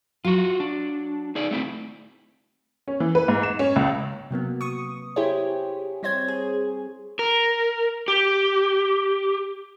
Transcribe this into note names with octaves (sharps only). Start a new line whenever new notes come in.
F#3 F4 F#4
D4
D#4 G#4 D5
A3 C4 E4
C#4
E3
B4
G#2
E7
C#4
C#2
C3 F#3 A#3 B3
C#6 D#6
E4 G4 G#4 C5 C#5
G3 C4 C5 C#5 G#6
G#4
A#4
G4